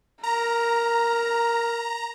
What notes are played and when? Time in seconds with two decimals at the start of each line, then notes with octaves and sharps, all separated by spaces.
0.23 A#4 A#5